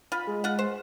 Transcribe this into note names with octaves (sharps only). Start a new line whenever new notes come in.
F4 B5
G#3
F4 F#5
C5